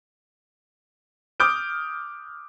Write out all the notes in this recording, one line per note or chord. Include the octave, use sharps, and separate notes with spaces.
D6 D#6 F6 G6 D7